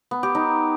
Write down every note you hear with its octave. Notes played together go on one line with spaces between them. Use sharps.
B3
G4
D#4